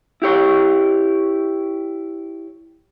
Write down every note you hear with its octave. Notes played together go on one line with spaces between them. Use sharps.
E4 G4 C#5